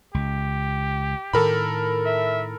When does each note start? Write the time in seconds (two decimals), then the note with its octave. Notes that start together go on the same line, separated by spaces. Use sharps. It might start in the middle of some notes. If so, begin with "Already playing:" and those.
0.14 C#2 G4
1.33 A2 D#3 A4 A#4 B5
2.06 E5